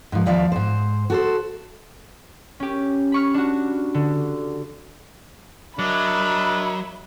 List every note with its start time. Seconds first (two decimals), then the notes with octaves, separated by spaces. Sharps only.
0.12 G#2 F3
0.26 D#2 F3 D5 E5 F5
0.52 G#2 C5
1.10 F#4 A4 C5
2.60 C#4 G4
3.12 B5 C#6 F6
3.34 D4 F#4
3.94 D3
5.79 F#3 D4 A#4 D#5 E5 B5